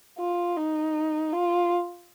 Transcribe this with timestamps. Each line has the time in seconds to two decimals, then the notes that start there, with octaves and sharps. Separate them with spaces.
0.19 F4
0.57 D#4
1.33 F4